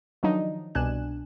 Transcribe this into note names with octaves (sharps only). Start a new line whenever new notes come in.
D#3 F3 F#3 D4 D#4
C2 B2 D4 G#5 F#6 E7